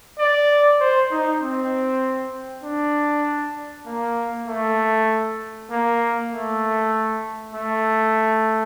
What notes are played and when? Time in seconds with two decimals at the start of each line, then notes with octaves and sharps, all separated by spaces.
0.19 D5
0.80 C5
1.11 D#4
1.41 C4
2.63 D4
3.87 A#3
4.48 A3
5.71 A#3
6.32 A3
7.55 A3